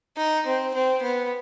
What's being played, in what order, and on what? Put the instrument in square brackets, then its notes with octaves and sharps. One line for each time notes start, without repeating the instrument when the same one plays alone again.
[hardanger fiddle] D#4
C4
C4
B3